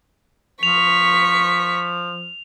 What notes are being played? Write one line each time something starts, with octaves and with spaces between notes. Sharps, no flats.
F3 C#6 B6 F7